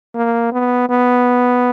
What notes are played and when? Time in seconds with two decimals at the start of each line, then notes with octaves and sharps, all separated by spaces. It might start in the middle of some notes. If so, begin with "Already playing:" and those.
0.15 A#3
0.52 B3
0.89 B3